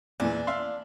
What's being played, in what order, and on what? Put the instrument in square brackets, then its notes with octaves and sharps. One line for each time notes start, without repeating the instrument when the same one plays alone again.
[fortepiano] E2 A#2 E3 [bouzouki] D4
[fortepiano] E5 F5 C6